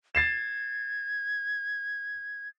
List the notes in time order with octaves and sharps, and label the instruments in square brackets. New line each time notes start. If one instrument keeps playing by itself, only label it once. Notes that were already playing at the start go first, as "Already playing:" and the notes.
[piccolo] G#6 [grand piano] A6 C7 E7